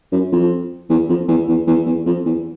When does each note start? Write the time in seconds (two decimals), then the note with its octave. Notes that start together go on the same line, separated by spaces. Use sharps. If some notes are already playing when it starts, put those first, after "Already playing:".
0.12 F#2
0.32 F2
0.90 E2
1.09 F2
1.28 E2
1.48 E2
1.67 E2
1.86 E2
2.06 F2
2.25 E2